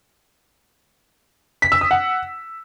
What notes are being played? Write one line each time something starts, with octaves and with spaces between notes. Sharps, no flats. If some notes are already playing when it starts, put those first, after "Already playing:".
B6
E6
D#6
F#5